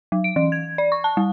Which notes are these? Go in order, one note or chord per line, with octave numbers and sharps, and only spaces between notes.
F#3
D7
E3
G#6
D5
C#6
A5
G3